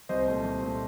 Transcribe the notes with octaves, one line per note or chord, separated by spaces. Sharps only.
C2 C5 D#5
A#2 A3
C2
A#2 A3